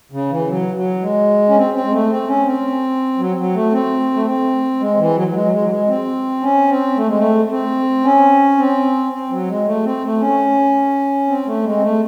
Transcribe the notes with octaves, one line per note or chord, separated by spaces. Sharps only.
C#3
E3
F#3
F#3
G#3
C#4
C4
C4
G#3
A3
C4
C#4
C4
F#3
F#3
A3
C4
A3
C4
G#3
E3
F#3
F#3
G#3
F#3
G#3
F#3
G#3
C4
C#4
C4
A3
G#3
A3
A3
C4
C#4
C4
C4
F#3
G#3
A3
C4
A3
C#4
C4
A3
G#3
C4
A3